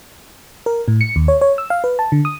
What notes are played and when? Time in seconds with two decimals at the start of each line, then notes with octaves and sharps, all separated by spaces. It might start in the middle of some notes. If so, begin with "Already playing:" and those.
0.66 A#4
0.88 A2
1.01 C#7
1.16 D#2
1.28 C#5
1.41 C#5
1.58 E6
1.70 F5
1.84 B4
1.99 A5
2.12 D3
2.25 D#6